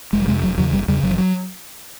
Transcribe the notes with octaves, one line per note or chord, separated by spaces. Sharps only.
F1 G#3
G3
F2 C3 G#3
E1 F#3
E2 C#3 F#3
F#1 G3
E2 C#3 G3
F#1 F#3
F3
F#3